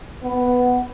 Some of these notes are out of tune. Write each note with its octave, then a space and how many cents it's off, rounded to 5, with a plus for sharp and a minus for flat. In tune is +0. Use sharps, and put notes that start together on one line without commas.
B3 +5